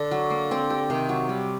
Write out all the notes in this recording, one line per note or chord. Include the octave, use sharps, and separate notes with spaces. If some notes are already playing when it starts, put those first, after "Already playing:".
Already playing: D3 D4
F#3
A#3
C4
G4
C3 D#3
F#3
G3 G4